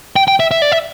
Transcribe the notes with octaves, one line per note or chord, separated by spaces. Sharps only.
G5
G5
E5
E5
D5
E5